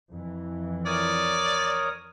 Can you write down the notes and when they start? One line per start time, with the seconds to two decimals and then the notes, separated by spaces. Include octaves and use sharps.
0.10 F2 E3
0.86 A#4 C#5 D5 D#6